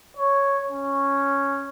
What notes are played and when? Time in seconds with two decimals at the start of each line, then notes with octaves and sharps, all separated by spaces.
0.17 C#5
0.70 C#4